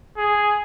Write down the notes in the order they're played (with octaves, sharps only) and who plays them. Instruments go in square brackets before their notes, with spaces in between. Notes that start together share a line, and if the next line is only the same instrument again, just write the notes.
[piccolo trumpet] G#4